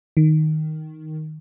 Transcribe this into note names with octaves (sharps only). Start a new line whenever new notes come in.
D#3